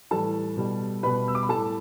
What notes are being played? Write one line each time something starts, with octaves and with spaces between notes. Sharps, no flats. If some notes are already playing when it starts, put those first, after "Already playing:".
A2 E3 G3 A4 A5
B2 G3
B2 G3 B4 B5
E6
D6
B5
A2 G3 A4 A5